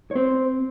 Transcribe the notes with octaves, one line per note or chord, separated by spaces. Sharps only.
C#5
C4 C5